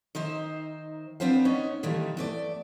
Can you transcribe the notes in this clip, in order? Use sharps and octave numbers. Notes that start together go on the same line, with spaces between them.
D#3 D#4 C5 E5
B3 C4 D4 B4 C5 F5
B3 C#4 D#4
A#2 D#3 E3 G3 A3
E2 A3 D5